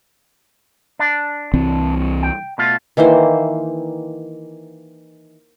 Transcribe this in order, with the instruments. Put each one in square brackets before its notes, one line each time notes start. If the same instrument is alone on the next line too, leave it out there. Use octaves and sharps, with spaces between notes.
[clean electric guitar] D4
[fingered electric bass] C2 E3 C4
[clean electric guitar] G5
B2 A3 F4
[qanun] D#3 E3 A#3 C5